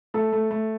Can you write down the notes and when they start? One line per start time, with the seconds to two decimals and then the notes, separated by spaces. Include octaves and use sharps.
0.14 A3 A4
0.33 A3
0.51 A3